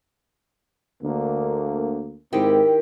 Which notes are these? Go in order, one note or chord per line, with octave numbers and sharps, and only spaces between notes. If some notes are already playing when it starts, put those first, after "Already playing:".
D2 D3 A#3
G#2 D#3 C4 E4 G4